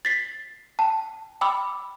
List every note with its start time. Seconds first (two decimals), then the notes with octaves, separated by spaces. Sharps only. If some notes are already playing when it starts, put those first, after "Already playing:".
0.05 A6 B6 C7
0.79 G5 A5
1.41 G5 B5 D6 E6